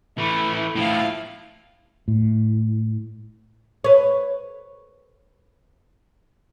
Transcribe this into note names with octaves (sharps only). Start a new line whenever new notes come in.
E3 A3 E4
A2 F3 E4 F5
A2
B4 C#5